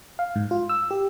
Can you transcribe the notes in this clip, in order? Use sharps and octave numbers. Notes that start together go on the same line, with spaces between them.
F5
G#2
F4
E6
G4